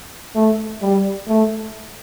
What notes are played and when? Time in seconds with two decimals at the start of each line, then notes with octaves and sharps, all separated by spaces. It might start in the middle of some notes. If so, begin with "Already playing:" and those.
0.35 A3
0.82 G3
1.28 A3